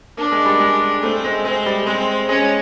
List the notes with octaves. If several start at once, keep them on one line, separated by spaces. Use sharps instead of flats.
A#3 D4
G#3
G3
G#3
A3 C4
G#3
G#3 C4
G3
G#3 C4
G#3 C#4